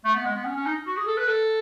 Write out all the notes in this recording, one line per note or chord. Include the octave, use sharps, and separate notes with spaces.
A3
B3
G#3
B3
C#4
C#4
D#4
F#4
G#4
A4
B4
A4